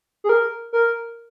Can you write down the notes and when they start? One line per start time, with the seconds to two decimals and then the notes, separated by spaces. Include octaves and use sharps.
0.24 G#4
0.29 A#4
0.73 A#4